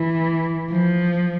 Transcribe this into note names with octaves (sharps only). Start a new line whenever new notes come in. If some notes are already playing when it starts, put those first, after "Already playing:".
Already playing: E3
F3